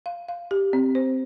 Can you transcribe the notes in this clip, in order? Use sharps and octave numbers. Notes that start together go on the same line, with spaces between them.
F5
F5
G4
C4
C5